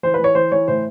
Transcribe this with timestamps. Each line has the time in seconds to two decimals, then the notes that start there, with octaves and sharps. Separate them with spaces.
0.03 E3 C5
0.14 B4
0.19 E3 C#5
0.35 E3 C5
0.52 E3 C#5
0.68 A2 C5